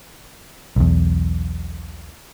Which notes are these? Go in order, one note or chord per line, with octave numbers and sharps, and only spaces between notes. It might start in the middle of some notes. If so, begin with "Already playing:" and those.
B1 E2